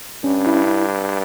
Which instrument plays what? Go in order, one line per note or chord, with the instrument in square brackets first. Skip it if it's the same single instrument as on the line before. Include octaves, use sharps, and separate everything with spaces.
[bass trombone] G2 [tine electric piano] C#4
[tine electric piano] E4